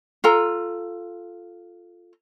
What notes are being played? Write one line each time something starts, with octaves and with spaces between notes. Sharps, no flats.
F4 A4 A#5